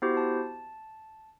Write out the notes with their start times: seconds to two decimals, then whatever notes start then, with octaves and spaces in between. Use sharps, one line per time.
0.02 B3 E4 F#4 G4 C5
0.17 A5